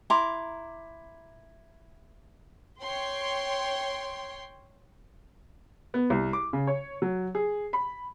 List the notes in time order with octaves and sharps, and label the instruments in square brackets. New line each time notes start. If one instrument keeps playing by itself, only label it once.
[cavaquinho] E4 A#5 C6 D6
[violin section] C#5 G5 C6
[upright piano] B3
C2
D6
C#3
C#5
F#3
G#4
B5